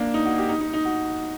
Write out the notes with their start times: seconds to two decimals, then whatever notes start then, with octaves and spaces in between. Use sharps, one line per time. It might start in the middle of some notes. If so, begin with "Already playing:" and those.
Already playing: A#3 D4
0.14 D#4
0.25 F#4
0.38 G4
0.49 D#4
0.61 D#4
0.73 D#4
0.85 F#4